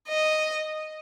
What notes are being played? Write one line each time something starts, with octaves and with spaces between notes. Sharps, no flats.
D#5